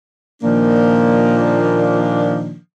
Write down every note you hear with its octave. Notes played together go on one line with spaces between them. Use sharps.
A#2 D#3 F3 A#3 D4